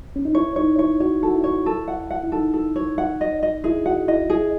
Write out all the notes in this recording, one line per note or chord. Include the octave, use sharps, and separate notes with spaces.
C#4
D#4
E4 C#5
D#4 C#5
E4 C#5
F#4 C#5
F#4 A4
E4
C#5
A4
F#5
F#5
E4
D#4 A4
A4
C#5
F#5
D#5
D#5
E4 G#4
F#4 F#5
E4 D#5
E4 G#4